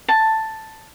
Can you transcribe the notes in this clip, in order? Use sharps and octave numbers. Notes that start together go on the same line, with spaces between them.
A5